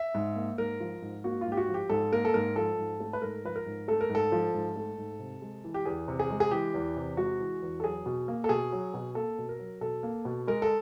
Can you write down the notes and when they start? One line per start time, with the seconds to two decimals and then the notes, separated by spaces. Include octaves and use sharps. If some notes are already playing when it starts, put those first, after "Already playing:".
Already playing: E5
0.14 G#2
0.36 A#3
0.58 G#2 A#4
0.80 F3
1.02 G#2
1.24 A#3 F#4
1.41 F4
1.46 G#2
1.52 G4
1.57 F#4
1.69 F3
1.74 G4
1.90 G#2 A4
2.12 A#3 A#4
2.25 A4
2.34 G#2 A#4
2.56 F3 A4
2.78 G#2
3.00 A3
3.13 B4
3.22 G#2 A#4
3.45 F3 B4
3.56 A#4
3.66 G#2
3.88 A3 A4
4.01 A#4
4.09 G#2
4.15 A4
4.32 F3
4.54 G#2
4.76 A3
4.98 G#2
5.19 C3
5.42 G#3
5.64 E3
5.74 G4
5.85 E2 G#4
6.08 C3
6.19 G#4
6.30 G#3
6.40 G#4
6.51 E3 G4
6.74 E2
6.96 C3
7.17 G#3 F#4
7.40 E3
7.62 E2
7.80 A4
7.84 F#3 G#4
8.06 B2
8.28 A#3
8.44 A4
8.49 B2 G#4
8.72 F#3
8.94 B2
9.15 A#3 A4
9.38 B2
9.49 A#4
9.59 F#3
9.81 B2 A4
10.03 A#3
10.25 B2
10.47 G#3 A#4
10.62 A4